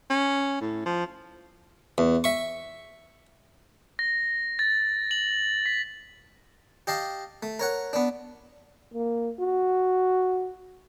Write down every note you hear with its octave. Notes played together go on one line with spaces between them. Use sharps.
C#4
A2
F3
E2
E5 C#6
A#6
A6
F#7
B6
G4 D#5 F5 A5
A3
A#4 C#5 F#5
B3 D4
A#3
F#4